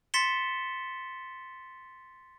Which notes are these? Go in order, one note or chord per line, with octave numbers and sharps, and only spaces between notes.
C6 A6 B6 C#7 E7 G7